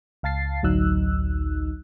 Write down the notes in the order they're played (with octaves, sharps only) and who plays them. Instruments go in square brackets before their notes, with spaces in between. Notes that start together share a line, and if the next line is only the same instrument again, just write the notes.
[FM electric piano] C#2 F5 A5 A6 C7
A1 D2 F#3 D#4 E6 F#6